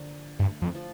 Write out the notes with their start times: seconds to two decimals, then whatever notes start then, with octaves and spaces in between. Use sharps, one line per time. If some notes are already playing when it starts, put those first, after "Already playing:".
Already playing: D3 F3 A#3
0.39 G2 A3
0.61 F2 F3
0.75 F3